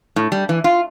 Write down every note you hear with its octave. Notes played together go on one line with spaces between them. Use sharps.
A2
G3
E3
F4